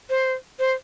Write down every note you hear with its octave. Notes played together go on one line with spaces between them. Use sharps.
C5
C5